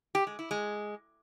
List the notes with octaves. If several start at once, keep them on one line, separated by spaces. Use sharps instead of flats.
G4
G#3
E4
G#3